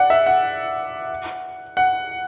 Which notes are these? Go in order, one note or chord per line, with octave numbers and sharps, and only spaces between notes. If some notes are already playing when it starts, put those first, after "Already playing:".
Already playing: D5 F#5
E5
F#5
F#5